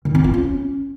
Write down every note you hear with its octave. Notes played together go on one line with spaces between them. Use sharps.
D#3
C4
F4
C#4